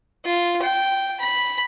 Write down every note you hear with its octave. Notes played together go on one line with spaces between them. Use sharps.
F4
G5
B5